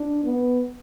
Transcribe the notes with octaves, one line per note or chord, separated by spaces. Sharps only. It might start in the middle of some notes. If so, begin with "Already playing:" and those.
Already playing: D4
B3